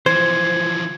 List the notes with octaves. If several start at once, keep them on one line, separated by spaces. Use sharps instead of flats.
E3 F3 C5 G#6